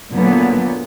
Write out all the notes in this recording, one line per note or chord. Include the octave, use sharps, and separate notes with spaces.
A#2 D3 F#3 B3